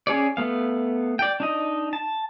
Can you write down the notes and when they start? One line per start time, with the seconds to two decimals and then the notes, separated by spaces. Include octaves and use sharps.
0.07 C#4 G#4 C#5 D5
0.37 A3 B3 F5
1.19 D5 G5
1.40 D4 D#4 D#5
1.93 A5